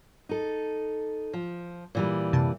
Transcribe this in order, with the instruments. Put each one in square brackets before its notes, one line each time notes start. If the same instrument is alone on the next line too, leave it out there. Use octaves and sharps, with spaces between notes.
[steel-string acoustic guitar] D#4 A4
F3
A#2 E3 G3
[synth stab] F#2 C3 A5